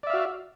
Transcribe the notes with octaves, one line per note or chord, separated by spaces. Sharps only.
F#4 D5 E5 F5